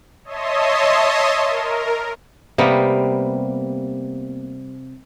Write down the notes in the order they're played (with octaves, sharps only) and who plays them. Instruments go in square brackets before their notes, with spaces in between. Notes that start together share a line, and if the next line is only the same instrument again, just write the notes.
[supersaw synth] C#5 D#5 E5 A5 C6 D#6
A#4
[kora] C3 G3 A#3 B3